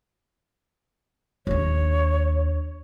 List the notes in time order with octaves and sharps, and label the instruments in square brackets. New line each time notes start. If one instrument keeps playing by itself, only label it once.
[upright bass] D#2 D4 [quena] C#5